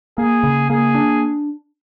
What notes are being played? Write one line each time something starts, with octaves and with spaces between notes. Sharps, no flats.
A#3 G#4
C#3
A#3 G#4
D4